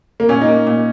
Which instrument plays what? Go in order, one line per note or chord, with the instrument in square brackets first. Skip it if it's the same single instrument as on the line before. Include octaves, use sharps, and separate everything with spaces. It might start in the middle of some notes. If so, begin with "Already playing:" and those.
[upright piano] A#3
[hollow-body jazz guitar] A#2 [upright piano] C#4
[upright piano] D#4
[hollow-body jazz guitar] A#3
A#2